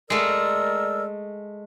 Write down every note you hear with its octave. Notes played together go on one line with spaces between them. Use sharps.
G#3 A3 A#4 D5 E6